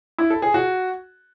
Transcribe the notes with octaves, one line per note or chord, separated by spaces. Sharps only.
E4
A4
G#4
F#4